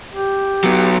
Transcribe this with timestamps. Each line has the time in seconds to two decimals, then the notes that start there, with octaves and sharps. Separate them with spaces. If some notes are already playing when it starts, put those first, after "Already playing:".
0.13 G4
0.64 F#3 B3